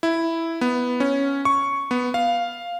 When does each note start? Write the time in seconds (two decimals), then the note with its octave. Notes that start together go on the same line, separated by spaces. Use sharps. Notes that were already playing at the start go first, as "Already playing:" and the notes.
0.03 E4
0.61 B3
1.00 C#4
1.45 C#6
1.91 B3
2.14 F5